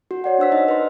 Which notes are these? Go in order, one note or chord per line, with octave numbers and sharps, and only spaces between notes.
F#4
C#5 D5 F#5
D4 C5 E6 B6
D#4 D#5
B4 C6